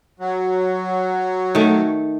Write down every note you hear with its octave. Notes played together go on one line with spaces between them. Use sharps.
F#3
D#3 A3